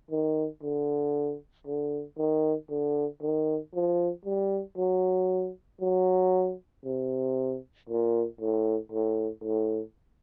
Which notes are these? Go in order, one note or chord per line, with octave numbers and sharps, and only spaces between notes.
D#3
D3
D3
D#3
D3
D#3
F3
G3
F#3
F#3
C3
A#2
A2
A2
A2